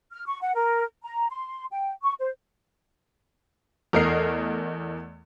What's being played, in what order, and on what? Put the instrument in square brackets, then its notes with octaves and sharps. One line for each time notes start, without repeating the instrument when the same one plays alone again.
[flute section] F6
C#6
F#5
A#4
A#5
C6
G5
C#6
C5
[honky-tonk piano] E2 A3 A#4 D#5 F6 C7